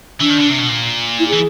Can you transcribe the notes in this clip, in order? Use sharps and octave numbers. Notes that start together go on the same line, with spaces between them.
E3 D4
D#3
D3
C3
B2
A#2
E4
E3 G#4